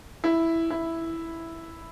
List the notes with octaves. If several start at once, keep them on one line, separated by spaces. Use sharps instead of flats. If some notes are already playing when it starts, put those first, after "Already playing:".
E4
E4